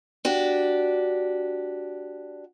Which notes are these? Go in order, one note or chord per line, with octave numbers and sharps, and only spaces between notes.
D4 F#4 G4